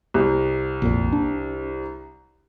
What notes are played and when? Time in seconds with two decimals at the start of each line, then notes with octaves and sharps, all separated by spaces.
0.14 C2
0.82 A#1 F2 A#2
1.13 D4